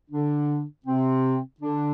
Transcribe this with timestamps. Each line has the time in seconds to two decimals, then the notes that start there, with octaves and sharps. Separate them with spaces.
0.10 D3 D4
0.86 C3 C4
1.61 D3 D4